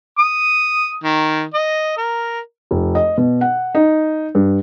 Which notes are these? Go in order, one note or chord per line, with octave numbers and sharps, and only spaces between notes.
D#6
D#3
D#5
A#4
F1
D#5
B2
F#5
D#4
G2